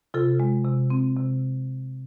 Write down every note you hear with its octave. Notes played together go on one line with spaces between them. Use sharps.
C3 F4 A4
G#3
C3
C4
C3